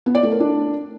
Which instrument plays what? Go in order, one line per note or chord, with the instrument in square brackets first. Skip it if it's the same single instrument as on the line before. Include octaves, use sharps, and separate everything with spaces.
[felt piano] B3
D5
A3
A#4
D4